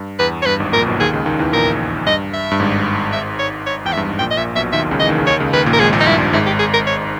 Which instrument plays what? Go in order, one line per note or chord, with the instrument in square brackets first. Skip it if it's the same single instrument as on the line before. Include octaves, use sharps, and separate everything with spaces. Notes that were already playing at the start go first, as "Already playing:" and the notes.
Already playing: [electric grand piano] G2
[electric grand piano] E2 [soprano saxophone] B4
[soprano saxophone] C#5
[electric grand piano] G2 [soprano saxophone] B4
[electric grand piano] G#1 G#2
[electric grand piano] A#1 A#2 [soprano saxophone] A#4
[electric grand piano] B1 B2
[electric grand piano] D#2 D#3 [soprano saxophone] G#4
[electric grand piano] C#2 C#3
D#2 D#3
E2 E3
[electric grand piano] A#1 A#2 [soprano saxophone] A#4
[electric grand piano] G2 [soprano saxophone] D#5
[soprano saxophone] E5
[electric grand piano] G2
G#1 G#2
[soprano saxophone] E5
C#5
C#5
[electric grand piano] E2 [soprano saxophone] G5
[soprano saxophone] E5
[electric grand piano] G2
G#2
[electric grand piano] A#1 A#2 [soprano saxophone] G5
[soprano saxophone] D#5
[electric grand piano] A#1 A#2 [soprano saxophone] E5
[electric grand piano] B1 B2 [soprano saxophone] E5
[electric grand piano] D#2 D#3 [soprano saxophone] E5
[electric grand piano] C#2 C#3
[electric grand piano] E3 [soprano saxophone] D#5
[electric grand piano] D#2 D#3
C#3
[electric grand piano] D#2 D#3 [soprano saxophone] C#5
[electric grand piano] C#2 C#3
[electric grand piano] D#2 D#3 [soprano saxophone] B4
[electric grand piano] A#1 A#2
[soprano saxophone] A#4
[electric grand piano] G#1 G#2 [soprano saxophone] G#4
[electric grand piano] A#1 A#2
[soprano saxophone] D#4
[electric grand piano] G2 [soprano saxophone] E4
[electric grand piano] G2
[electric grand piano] G#1 G#2 [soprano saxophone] E4
[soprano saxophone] G4
G#4
A#4
C#5